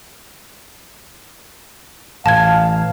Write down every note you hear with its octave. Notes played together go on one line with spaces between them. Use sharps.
A1 F5 A5 G#6